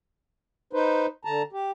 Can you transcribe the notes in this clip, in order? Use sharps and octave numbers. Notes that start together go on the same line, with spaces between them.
D#4 B4 C5
D3 A5 A#5
G4